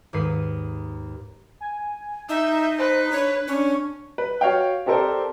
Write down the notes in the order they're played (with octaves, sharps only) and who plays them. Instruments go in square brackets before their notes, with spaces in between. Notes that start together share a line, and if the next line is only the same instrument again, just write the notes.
[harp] D#2 G#2 B4 C7 D#7
[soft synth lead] G#5
[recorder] D#4 [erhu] E5 [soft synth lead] G6
[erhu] B4 [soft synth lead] C5
[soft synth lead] D4 [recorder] C#5
[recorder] C#4 [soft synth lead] D4
[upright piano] B4
F#4 C#5 F5 G5
C4 G4 A4 A#4 C5 D5